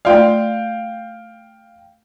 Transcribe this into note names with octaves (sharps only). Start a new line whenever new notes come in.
A3 F4 D5 F5 G5